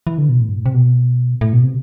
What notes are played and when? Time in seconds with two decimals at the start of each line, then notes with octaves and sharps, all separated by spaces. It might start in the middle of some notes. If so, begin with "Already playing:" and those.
0.07 E3
0.18 D3
0.29 B2
0.40 A2
0.49 G2
0.57 A2
0.66 C3
0.74 B2
1.41 A2
1.53 B2
1.64 C3